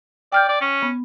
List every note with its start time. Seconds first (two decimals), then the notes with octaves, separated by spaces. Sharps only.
0.32 D5 G5 F6 G6
0.48 D5
0.61 C#4
0.83 B3